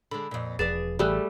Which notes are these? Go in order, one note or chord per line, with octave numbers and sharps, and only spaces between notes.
D3 G#3 B5
F2 A#2
E1 F3 G#4 B4 D5 A6 E7
A1 E3 G3 A3 G#4 B5 E6 F#6